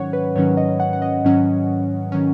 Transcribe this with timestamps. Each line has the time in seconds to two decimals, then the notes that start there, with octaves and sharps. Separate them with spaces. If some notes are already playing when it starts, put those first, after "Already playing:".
Already playing: G#2 D#3 F#3 C#4 C#5 F#5
0.13 B4
0.35 G#2 D#3 F#3 C#4 C#5
0.57 D#5
0.80 F#5
0.93 F#5
1.02 D#5
1.25 G#2 D#3 F#3 C#4
2.12 D#3 F#3 C#4